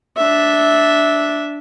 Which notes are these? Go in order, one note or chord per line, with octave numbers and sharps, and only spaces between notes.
D4 E5